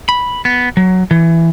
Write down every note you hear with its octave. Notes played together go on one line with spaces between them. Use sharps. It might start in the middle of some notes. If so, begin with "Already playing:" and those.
B5
B3
F#3
E3